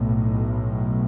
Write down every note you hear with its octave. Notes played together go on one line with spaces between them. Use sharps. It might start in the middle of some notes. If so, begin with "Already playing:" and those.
Already playing: B1 A2